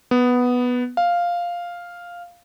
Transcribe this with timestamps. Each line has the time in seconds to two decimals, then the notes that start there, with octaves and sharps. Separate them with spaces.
0.11 B3
0.97 F5